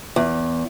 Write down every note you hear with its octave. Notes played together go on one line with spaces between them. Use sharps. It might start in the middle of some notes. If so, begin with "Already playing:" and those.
E2